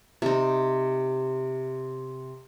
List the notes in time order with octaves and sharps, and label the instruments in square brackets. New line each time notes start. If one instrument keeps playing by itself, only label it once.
[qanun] C3 D#4